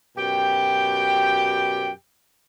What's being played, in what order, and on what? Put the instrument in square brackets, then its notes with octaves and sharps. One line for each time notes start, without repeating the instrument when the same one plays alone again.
[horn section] F#2 B2 G4 G5